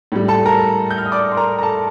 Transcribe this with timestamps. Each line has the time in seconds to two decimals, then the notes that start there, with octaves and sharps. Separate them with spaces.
0.12 A2 G3
0.28 A4 A5
0.46 A#4 A#5
0.91 G6
0.98 F6
1.06 D#6
1.12 D5 D6
1.32 C6
1.37 A#4 A#5
1.59 A#5
1.62 A4 A5